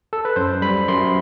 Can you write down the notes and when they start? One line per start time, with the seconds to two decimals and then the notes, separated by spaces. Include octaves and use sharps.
0.13 A4
0.25 B4
0.36 F#2 C5
0.62 G3 B5
0.88 F#2 C6